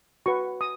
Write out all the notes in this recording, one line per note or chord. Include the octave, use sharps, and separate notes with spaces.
F#4 B4 C#6
D#6